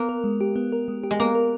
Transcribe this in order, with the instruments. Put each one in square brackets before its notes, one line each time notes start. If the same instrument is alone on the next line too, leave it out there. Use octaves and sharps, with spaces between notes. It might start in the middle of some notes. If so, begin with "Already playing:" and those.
Already playing: [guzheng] A#3 [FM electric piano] B3
[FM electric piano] A#4
G#3
G4
B3
A#4
G#3
G4
[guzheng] G#3
[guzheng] A#3 [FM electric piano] B3
[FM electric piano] A#4